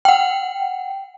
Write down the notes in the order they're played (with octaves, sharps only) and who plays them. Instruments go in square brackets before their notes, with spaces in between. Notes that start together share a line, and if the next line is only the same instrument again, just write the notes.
[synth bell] F#5 G5